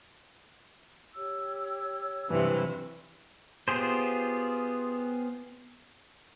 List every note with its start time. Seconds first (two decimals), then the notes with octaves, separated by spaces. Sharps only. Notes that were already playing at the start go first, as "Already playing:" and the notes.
1.15 G4 C#5 E6
2.29 G2 C3 E3 F#3
3.68 B3 F4 G4 G#4 C5